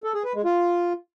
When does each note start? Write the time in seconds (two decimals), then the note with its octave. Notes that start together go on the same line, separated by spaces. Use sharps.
0.04 A4
0.14 G#4
0.24 B4
0.35 G#3
0.45 F4